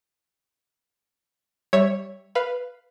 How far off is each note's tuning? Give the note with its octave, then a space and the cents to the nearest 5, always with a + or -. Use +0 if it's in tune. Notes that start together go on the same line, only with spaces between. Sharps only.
G3 +0 C#5 +0 E5 +0
B4 +0 F5 +0